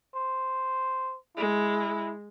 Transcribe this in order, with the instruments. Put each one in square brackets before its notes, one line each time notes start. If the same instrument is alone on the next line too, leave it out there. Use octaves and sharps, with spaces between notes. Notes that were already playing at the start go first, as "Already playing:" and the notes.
[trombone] C5
[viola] G#3 [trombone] E4